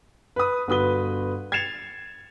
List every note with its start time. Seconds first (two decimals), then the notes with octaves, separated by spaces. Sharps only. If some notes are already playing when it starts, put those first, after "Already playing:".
0.36 B4 D#6
0.68 G1 F#4 B4 D#6 G7
1.52 G#6 A6 C7 C#7 E7 F7